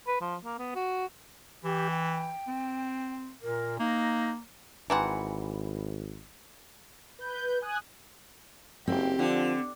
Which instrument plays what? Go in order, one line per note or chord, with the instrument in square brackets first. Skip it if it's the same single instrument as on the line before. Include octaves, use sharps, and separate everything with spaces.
[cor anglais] B4
F3
A#3
B3
F#4
[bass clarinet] E3 [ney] G4
[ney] G5
[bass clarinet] C4
[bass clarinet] A#2 [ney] A#4
[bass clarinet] A#3 [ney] D#4
[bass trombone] G#1 [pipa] E3 G3 F#5 [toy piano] G#5 A#5 C6
[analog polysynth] B4 G6
G#5 D#6 F#6
[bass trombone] F#1 [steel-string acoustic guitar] C4 [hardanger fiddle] G4
[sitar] D3 [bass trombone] F3